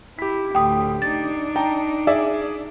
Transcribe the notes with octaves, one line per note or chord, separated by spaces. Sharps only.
E4 G4 B6
D2 A2 G5 D#6
D4 D#4 A6
G5 A5 A#5
G#4 D5 E5